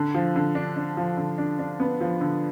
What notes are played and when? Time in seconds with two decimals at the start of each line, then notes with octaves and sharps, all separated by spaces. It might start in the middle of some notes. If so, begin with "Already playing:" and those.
Already playing: D3
0.15 F3
0.36 D3
0.55 D4
0.77 D4
0.97 F3
1.17 D3
1.38 D4
1.59 D4
1.80 B3
2.01 F3
2.21 D3